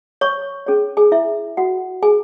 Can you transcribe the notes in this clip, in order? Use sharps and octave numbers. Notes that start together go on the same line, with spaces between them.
C#5 C#6
C#4 G#4 C#5
G#4 G#5
E4 E5
F#4 F#5
G#4 G#5